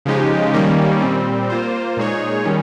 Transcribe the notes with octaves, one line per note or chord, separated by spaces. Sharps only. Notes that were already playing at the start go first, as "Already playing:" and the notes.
C#3 F3 G#3 D#4 G4
D#3 G3 A#3 C#4
A#2 G3 C4
A#3 F4 C5
A#2 G#3 D#4 G#4 C#5
D#3 G3 C#4